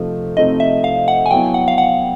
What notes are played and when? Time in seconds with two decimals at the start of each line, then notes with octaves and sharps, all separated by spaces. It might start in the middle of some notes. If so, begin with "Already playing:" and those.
Already playing: C3 F3 A3 C4 D#4
0.37 C3 F3 A3 C4 D#4 D#5
0.60 E5
0.84 F5
1.08 F#5
1.26 G#5
1.31 F#3 B3 E4 G5
1.54 F#5
1.68 F5
1.78 F#5